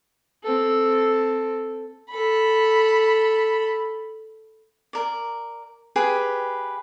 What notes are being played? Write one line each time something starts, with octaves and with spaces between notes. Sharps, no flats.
C4 A4
A4 B5
A#4 D5
G4 G#4 B4